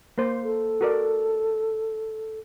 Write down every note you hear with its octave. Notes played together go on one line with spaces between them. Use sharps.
A#3 C5
A4
F#4 A#4 D5